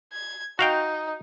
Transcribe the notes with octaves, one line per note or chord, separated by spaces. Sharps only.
G#6
D#4 F#4 F5 G5